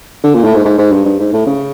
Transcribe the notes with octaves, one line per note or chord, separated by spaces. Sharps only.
D3
A#2
A2
G#2
G#2
G#2
G2
G2
G#2
A2
C#3